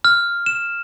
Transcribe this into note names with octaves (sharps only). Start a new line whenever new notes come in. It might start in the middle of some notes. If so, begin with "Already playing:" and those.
F6
E7